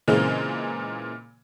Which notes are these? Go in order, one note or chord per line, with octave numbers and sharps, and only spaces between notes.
A#2 C#3 E3 G#3 A#3 C4